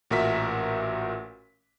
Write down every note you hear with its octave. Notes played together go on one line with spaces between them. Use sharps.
A1 A#2 F#4 A#4 E5 B6